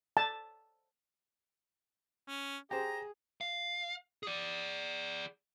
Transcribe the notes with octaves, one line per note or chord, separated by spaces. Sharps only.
A5
C#4
G4 G#4 C5 A#5
F5
G#4 D5